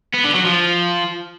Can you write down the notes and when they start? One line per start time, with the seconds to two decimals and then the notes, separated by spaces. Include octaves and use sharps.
0.14 B3
0.24 D3
0.35 F#3
0.45 F3